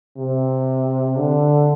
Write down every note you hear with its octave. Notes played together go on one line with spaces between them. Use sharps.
C3
D3